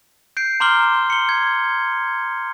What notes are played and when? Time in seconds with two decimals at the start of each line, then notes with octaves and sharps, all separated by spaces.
0.37 G6 C7 D7
0.60 A#5 C6 D6 F6 G7
1.10 C#7 G7
1.29 G#6